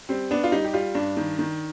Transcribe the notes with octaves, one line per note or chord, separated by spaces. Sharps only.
G3 C4
B3 D4
F4
G3 D#4
G4
G3 F4
G2 D4
D#3
D#3